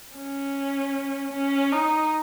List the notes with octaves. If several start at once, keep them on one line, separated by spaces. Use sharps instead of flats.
C#4
C#4
D#4